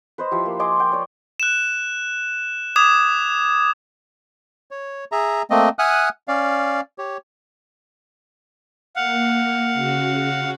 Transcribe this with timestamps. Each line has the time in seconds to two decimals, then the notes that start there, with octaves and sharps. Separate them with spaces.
0.18 B4 C5 D#5
0.31 F3 E4 G4
0.46 A#3
0.59 D#5 G#5 C6 D6
0.80 G5
0.92 C#5 D5
1.40 F#6 E7
2.76 D6 D#6 G#6 E7
4.71 C#5
5.12 G#4 E5 A#5
5.50 A3 A#3 C4 D#5
5.79 E5 F#5 G#5 D#6 F6 F#6
6.28 C#4 D5 F5
6.98 G4 C#5
8.96 A#3 F5 F#5
9.74 C#3 F#4